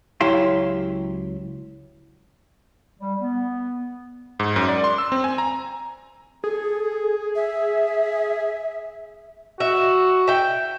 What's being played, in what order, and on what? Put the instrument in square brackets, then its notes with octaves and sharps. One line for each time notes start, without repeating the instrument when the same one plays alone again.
[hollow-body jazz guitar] C#2 F#3 E4 G4 F5 C6
[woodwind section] G3
B3
[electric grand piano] G#2
F#2
D5
C6
E6
C4
G#5
A#5
[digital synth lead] G#4 [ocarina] A4
[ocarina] E5
[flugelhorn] F#4 [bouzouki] E5
[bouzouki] E5 G5